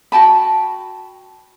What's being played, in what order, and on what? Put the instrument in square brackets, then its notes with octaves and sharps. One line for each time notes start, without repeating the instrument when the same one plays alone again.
[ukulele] F#4 G5 A5 B5